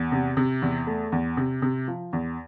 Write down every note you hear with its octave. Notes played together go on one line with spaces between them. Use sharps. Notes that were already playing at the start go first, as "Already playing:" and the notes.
Already playing: E2
C3
C3
E2
A3
E2
C3
C3
F3
E2